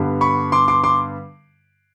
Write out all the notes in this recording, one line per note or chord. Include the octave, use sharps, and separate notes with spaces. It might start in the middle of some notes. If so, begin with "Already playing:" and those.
Already playing: G2 D3 G3 B3
B5 C#6
C6 D6
C6 D6
C6 D6